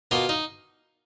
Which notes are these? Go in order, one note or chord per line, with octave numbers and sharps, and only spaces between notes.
B2 A#3 F4
D#4